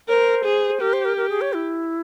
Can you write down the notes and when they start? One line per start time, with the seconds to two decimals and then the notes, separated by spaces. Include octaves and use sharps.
0.09 A#4 C#5
0.13 C5
0.45 G#4
0.81 G4 A#4
0.93 C5
1.05 A#4
1.17 A#4
1.29 G#4
1.41 C#5
1.53 E4